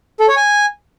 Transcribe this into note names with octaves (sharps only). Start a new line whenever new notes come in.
A4
C#5
G#5